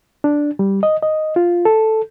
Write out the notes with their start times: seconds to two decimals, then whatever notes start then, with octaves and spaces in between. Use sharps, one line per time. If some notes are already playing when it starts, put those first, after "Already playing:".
0.24 D4
0.59 G3
0.83 D#5
1.03 D#5
1.36 F4
1.65 A4